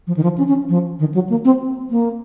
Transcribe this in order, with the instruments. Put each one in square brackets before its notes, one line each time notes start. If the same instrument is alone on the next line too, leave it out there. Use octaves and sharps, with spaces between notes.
[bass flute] F3
D#3
F3
C#4
C#4
F3
D#3
F#3
A#3
C4
A#3